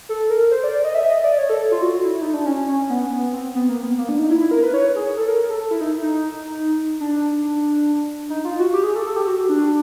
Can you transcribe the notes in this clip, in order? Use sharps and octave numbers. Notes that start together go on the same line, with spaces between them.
A4
A#4
C5
D5
D5
D#5
E5
D#5
D5
C#5
A4
F4
F#4
E4
D#4
D4
C#4
C#4
B3
B3
C4
B3
A#3
B3
A#3
D4
D#4
E4
E4
A#4
B4
C#5
G#4
A4
A#4
A4
E4
D#4
D#4
D4
D#4
F4
F#4
G4
G#4
A4
A4
G4
F#4
F#4
D4